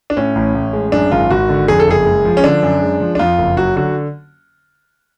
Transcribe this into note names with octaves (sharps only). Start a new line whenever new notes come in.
D4
A2 C#4
A1
A1
G#3
F#2 D4
G#1 F4
G#1 F#4
D3
F2 G#4
A4
F#1 G#4
G#3
F3
C#4
D3 D4
F#2
G#3
F3
D4
F2 F4
F#1
F#3 F#4
D3 F#4